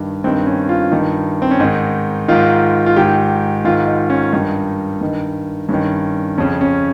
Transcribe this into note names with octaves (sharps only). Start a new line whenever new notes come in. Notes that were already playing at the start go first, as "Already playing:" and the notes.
Already playing: G2 D#3
G2 D#3 C4
C#4
F4
G2 D#3 D#4
C4
C#4
G#2 D#3 D#4
G#2 D#3 F4
F4
G#2 D#3 G4
G#2 D#3 F4
D#4
C#4
G2 D#3 D#4
G2 D#3
G2 D#3 C#4
F2 C#3 C#4
C#4